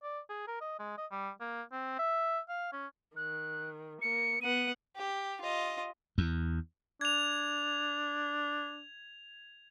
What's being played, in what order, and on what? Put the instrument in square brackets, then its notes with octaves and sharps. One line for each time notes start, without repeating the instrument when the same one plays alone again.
[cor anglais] D5
G#4
A#4
D#5
G#3
D#5
G3
A#3
C4
E5
F5
C#4
[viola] D#3 [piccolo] F#6
[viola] A#3 [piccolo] C#7
[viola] B3 F#5 [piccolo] D#7
[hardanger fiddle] G4
F4 D#5
[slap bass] E2
[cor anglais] D4 [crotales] G#6 F7